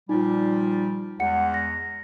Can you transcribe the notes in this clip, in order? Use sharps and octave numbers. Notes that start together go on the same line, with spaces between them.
A#2 F3 G3 D#4 F4
E2 G#3 F#5 C#7
A#6